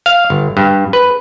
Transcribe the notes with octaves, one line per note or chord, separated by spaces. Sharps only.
F5
G1
G2
B4